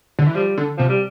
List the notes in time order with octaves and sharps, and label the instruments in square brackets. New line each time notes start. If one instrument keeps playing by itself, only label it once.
[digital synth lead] D3
E3
[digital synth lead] F3 [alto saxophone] G3
[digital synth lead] D3
[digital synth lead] C3 [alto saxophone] F3
[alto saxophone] G3